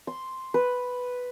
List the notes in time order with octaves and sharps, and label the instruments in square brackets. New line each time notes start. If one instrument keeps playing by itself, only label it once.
[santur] C6
B4